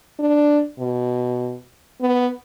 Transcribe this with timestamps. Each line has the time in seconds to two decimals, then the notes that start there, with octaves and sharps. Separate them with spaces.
0.19 D4
0.79 B2
2.01 B3